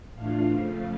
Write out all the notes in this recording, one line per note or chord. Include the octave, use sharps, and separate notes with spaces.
A2 E3 A3 D4 F4 F5
F2 C#3 F3 A3